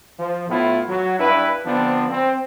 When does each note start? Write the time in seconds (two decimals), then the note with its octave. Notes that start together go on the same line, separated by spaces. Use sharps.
0.19 F3
0.49 A2 A3 B3 E4 F4
0.89 F#3
1.19 G2 D4 E4 B4
1.65 D3 F3 B3 C4 D4
2.10 C4